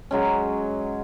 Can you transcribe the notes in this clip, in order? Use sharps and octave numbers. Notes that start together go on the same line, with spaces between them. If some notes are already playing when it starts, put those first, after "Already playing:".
F#3 G#3 C#4